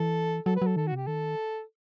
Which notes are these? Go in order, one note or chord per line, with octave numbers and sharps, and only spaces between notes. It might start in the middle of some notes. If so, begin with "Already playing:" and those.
Already playing: E3 A4
F#3 A4
B4
F#3 A4
D#3 A4
F#4
C3 G4
D#3 A4